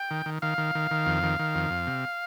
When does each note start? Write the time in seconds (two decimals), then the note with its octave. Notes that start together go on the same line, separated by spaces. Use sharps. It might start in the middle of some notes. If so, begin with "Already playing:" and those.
Already playing: G5
0.11 D#3
0.26 D#3
0.42 D#3 F5
0.58 D#3
0.75 D#3
0.91 D#3
1.06 F2
1.23 D#3
1.39 D#3
1.55 F2
1.70 F2
1.87 C3